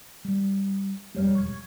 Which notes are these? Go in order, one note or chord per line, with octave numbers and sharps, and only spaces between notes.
G3
E1 F2 G3 G#3 C#5 F6
C#6 G#6